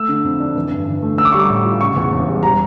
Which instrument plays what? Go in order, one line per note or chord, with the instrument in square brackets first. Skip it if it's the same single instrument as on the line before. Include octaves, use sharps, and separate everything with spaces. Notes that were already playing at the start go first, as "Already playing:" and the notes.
Already playing: [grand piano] A3 E6
D3
F2
D4
E3
G2
G1
A3
C#4 E6
D6
G3 C#6
D6
A2
F4
C#3 C#6
E2
E1
G3
G3 A#5